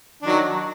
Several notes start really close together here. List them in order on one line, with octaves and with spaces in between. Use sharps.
D4 D#3 F#3